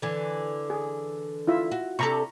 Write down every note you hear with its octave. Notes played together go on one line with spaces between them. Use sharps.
D3 E3
G#4
E4 F4 E5
F#4
C3 D4 A4 A#5 B5 C#6